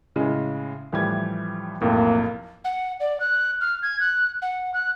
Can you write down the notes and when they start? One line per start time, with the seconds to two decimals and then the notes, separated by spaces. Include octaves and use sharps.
0.16 A2 C#3 G#3
0.92 A2 E3 F3 G3 G4 G#6
1.81 B1 F2 A2 A#3
2.65 F#5
3.00 D5
3.20 F#6
3.61 F6
3.82 G#6
4.00 F#6
4.42 F#5
4.74 F#6